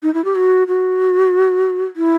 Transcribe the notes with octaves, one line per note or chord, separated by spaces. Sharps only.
D#4
E4
G4
F#4
F#4
E4